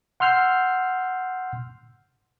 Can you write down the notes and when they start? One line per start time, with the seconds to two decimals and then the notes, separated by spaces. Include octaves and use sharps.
0.20 F#5 C6 E6 F6 G6 C7